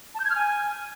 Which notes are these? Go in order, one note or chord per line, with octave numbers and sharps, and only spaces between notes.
A5
G6
G#6
F6
G#5